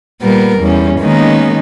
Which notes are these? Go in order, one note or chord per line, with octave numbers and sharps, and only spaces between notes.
A#2 G3 B3 A#4
E2 G3 C#4
D#3 G#3 A#3 B3 C#4 D#4